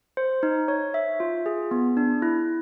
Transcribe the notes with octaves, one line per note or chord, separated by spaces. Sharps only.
C5
D#4
C#5
E5
F4
G#4
B3
D4
E4